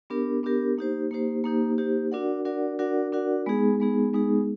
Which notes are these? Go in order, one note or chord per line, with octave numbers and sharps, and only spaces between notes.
B3 D4 G4 A#4
B3 D4 G4 A#4
A#3 D#4 G4 C5
A#3 D#4 G4 C5
A#3 D#4 G4 C5
A#3 D#4 G4 C5
D4 F#4 A#4 D5 F#5
D4 F#4 A#4 D5 F#5
D4 F#4 A#4 D5 F#5
D4 F#4 A#4 D5 F#5
G#3 B3 D#4 G#4
G#3 B3 D#4 G#4
G#3 B3 D#4 G#4